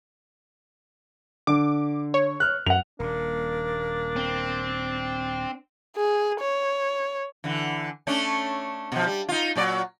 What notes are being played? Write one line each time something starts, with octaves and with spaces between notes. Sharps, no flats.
D3 D6
C#5
F6 F#6
F#2 F#5 F7
D#1 A#2 A#3 D4
C4
G#4
C#5
D3 E3
A3 C#4 D4
B2 F3
G3
D#4 F4
A#2 F#3 D5